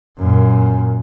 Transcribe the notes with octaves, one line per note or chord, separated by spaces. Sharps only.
F#2 A#2